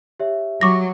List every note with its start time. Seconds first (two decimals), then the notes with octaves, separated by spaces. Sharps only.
0.20 G4 C#5 E5
0.61 F#3 C#6 D6 A#6